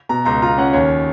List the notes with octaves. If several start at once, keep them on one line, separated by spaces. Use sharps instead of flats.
B2 A#5
C#2 A#5
F4 A#5
C#4 F#5
D#2 C#5